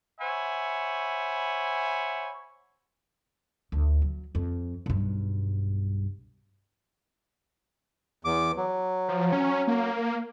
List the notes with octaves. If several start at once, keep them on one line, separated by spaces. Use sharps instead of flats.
C5 C#5 E5 F#5 G#5 B5
D2
F#3
F2
B1 G2
E2 D6
F#3
F3
C#4
A#3